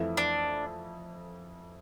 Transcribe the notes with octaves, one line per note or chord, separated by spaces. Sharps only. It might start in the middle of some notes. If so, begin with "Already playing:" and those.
Already playing: F2 E3 A3 E4
D4